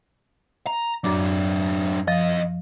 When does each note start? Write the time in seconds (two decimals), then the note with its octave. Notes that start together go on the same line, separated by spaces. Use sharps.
0.67 A#5
1.04 F#2 F#3 D4 D6
2.08 F2 F3 D#5